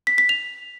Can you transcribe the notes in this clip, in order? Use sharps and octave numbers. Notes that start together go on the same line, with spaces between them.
B6
B6
F7